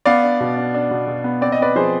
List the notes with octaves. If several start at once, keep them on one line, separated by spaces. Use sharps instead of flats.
B3 D5 F5
D4
B2
D4
D4
B2
B2
B3
C4 D5
D#5
C4 B4 D5
F3 G#4 C5